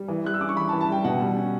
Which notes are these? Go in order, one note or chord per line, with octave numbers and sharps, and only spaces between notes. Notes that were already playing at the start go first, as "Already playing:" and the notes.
Already playing: G3
E3
G3 F#6
E6
C#4 D6
C#6
E3 B5
A5
E3
A5
G3 G5
B2 F#5
G3
C#4